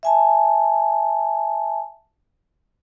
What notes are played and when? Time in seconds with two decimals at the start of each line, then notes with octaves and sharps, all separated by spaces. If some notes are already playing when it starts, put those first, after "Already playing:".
0.03 E5 G#5 A5